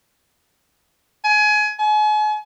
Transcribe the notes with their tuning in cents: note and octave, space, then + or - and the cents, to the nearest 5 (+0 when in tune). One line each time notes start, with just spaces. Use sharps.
G#5 +25
G#5 +40